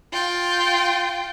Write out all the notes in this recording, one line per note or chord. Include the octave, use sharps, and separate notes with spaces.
F4 G5